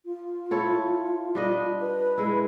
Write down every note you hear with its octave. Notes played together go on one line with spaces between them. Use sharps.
F4
E4 A4 C#5
G3 D4 D#5
B4
G#3 E4